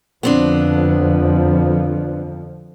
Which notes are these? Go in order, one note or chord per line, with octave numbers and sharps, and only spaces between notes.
F2 D3 F3 B3 C4 D4